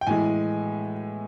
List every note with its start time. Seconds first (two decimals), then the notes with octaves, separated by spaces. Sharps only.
0.01 G5
0.07 A2 E3 G#3 G#5